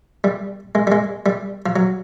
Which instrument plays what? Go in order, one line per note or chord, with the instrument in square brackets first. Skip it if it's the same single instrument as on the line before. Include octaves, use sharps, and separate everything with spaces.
[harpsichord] G3
G#3
G3
G#3
G3
F3
F#3